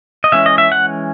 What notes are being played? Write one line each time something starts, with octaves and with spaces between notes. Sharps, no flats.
D#5
E3 G#3 C#4 E5
D#5
E5
F#5